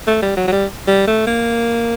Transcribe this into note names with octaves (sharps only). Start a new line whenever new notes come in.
A3
G3
F#3
F#3
G3
G3
A3
A#3